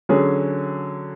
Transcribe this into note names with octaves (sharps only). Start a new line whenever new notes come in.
D3 F#3 C#4 G#4